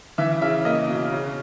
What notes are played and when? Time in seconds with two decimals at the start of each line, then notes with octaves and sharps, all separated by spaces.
0.18 E3 E5
0.41 C#3 E5
0.65 A#3 D#5
0.88 B2
1.12 C#3